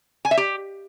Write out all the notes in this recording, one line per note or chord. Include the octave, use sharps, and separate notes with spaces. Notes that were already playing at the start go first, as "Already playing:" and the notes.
G#5
E5
G4